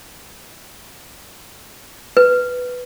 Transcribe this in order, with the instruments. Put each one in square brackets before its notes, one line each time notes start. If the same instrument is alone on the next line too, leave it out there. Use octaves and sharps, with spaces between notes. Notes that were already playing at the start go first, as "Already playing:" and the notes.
[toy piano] B4